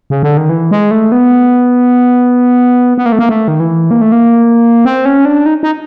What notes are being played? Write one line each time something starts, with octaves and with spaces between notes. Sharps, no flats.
C#3
D3
D#3
E3
G#3
A3
B3
B3
A#3
A3
A#3
A3
D#3
E3
A#3
A3
A#3
C4
C#4
D4
D#4
D#4